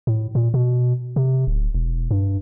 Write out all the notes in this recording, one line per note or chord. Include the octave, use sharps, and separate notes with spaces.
A2
A#2
B2
C3
D1
E1
G2